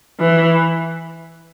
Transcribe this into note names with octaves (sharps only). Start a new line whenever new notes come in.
E3